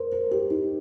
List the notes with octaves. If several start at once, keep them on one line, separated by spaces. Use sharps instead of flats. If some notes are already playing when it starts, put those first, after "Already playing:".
Already playing: A#4 C5
A#4
G4
D#4